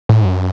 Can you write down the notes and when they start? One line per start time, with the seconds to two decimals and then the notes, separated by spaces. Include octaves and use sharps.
0.09 A2
0.21 G#2
0.25 F#2